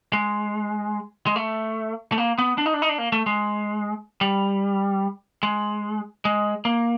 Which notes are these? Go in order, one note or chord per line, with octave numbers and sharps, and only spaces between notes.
G#3
G#3
A3
A3
A#3
B3
D4
D#4
D4
D#4
D4
A#3
A3
G#3
G3
G#3
G#3
A#3